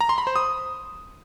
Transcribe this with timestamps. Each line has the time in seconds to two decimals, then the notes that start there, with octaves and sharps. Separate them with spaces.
0.01 A#5
0.09 C6
0.18 B5
0.27 C5
0.36 D#6